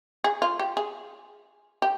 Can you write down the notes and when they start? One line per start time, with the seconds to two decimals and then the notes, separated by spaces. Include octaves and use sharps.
0.24 G#4
0.42 F4
0.59 G4
0.77 G#4
1.82 G4